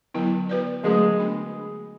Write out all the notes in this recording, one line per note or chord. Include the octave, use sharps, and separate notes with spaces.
D3 F#3 B3 E4
B3 F#4 B4 D5
D3 F#3 G#3 A3 C#4 F#4
B3 D4 F#4